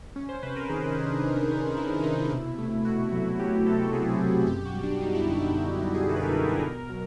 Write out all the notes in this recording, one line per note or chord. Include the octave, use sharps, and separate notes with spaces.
C#4
C5
C3 B4
A#4
D#3 G#4
D#4
C#4
D4
D#3
C#4
D#3 E4
C3 D#4
D#4
B2 E4
A3
B2 F#4
F#3
F#3 G4
C4 A4
A4
C4 G#4
B2
F#2 G4
F#4
G3
D4
F#2 D#4
E4
D3 D#4
D4
F#2 E4
G3 G4
G#4
F#2 A4
B4
A#4
D3
A#4
B2 A#4
F#3